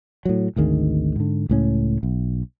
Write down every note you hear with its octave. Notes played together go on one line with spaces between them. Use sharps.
A2 F#3
G#1 D2 D#3 G#3
G#2 D3
C#2 A2 C#4
B1